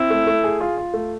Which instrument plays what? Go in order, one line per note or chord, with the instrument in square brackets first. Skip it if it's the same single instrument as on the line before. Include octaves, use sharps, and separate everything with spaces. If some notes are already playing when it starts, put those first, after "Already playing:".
Already playing: [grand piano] C4 [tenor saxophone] E4
[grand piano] A3
A3
G#4
F4
F4
A3